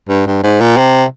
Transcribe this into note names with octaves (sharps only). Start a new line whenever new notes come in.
G2
G2
G#2
A#2
C3